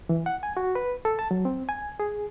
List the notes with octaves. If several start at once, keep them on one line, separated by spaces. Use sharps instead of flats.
E3
F#5
G#5
F#4
B4
A4
A5
F#3
C4
G#5
G#4